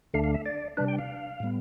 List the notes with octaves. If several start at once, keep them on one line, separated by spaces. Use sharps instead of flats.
D2 D3 A3 D4 F5
F5
E5
D5
C3 G3 D4 B4
G5
F5
A2 G3 B3